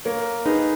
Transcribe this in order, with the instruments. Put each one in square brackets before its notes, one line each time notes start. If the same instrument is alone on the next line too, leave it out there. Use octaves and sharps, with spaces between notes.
[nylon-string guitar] A#3 [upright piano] A#4 C#5
[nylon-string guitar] D#4 [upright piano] G#4 B4